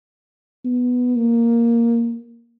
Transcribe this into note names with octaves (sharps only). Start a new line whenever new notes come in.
B3
A#3